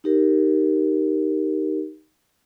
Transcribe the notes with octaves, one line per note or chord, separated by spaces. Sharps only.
D#4 G4 A#4